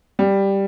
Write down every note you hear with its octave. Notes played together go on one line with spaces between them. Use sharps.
G3